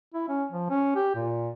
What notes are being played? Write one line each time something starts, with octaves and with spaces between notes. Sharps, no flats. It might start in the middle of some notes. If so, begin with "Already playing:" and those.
E4
C#4
F3
C#4
G4
A#2